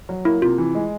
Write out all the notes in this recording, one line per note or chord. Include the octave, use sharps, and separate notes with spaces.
F#3
A#3 E4
C3 F4
E3
G#3